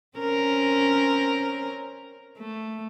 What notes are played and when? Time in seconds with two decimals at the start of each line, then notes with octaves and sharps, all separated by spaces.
0.18 C4 C#4 A#4
2.39 A3